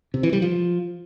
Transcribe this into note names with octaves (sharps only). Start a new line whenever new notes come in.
C3
E3
G3
F3